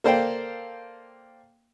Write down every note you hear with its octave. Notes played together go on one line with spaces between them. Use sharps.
A#3 A4 C5 D5 F5 G5